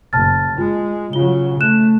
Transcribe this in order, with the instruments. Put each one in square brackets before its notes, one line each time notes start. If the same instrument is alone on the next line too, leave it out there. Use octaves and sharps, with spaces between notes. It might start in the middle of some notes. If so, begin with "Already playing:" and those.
[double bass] F#1 [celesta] A5 F6 A6
[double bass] G#3 [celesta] F4
[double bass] C#3 F#3 [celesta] F4 G7
[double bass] A3 [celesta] F#6 E7